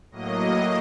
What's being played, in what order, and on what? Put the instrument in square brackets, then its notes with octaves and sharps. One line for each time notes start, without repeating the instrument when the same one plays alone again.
[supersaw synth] A2 F#3 A#3 D#5